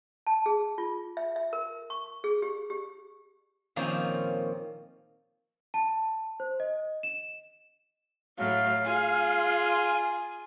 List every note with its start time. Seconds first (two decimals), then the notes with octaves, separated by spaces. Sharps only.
0.27 A5
0.46 G#4
0.78 F4
1.17 E5
1.36 E5
1.53 A#4
1.90 C#6
2.24 G#4
2.42 G4
2.70 G4
3.76 A#2 D#3 F3 A#3 C4 C#4
5.74 A5
6.40 C5
6.60 D#5
7.03 E7
8.38 A2 F#3 F5
8.83 F4 G#4 G#5